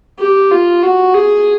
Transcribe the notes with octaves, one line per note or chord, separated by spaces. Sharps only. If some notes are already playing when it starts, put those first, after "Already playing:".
G4
F4
F#4
G#4